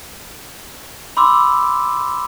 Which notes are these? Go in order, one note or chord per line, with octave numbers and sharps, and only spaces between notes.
B5 C6 D6 E6